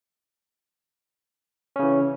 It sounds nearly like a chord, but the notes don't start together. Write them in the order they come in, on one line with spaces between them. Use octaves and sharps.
C#4 C#3 E3